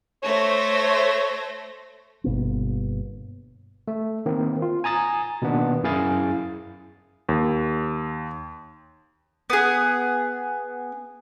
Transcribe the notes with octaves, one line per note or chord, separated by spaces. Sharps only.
A3 C5 C#5 A#6
G1 B2 A#3 B3
A3
D#3 A#3 C4
F4
G#5 A#5 D#6 A6
B2 D#3 A#3 B3 D4
F#2 E4 G#4 F5 G#5 A6
D#2
B3 G#4